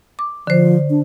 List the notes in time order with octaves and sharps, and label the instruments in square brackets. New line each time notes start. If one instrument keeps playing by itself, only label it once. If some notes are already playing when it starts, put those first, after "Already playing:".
[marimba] D6
[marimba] D3 C5 [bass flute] F3
[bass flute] D4